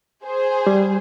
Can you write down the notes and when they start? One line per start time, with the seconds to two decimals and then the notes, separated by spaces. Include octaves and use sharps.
0.24 G#4 C5
0.67 G3